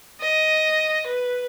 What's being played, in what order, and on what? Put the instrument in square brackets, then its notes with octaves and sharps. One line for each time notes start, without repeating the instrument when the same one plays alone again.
[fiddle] D#5
B4